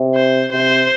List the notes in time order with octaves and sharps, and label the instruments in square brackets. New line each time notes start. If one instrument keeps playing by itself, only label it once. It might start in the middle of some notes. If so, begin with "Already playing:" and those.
Already playing: [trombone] C3
[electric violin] C5
[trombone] C3 [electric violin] C5